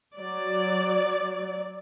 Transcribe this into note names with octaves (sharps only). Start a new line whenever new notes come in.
F#3 D5